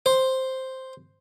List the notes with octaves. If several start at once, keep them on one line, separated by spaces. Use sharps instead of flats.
C5